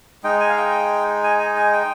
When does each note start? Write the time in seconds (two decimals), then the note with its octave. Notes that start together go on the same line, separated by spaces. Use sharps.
0.24 G#3 D#4 G5
0.40 G#5
0.49 F5
0.57 G5
1.23 G#5
1.39 G#5
1.56 G#5
1.73 G5